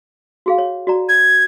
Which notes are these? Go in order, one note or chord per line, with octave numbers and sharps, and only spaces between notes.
F#4 G#4 F5
C#5
F#4 D5 A#5
G#6